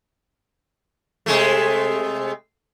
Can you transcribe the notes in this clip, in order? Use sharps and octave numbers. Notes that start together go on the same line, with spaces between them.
C3 G#3 A3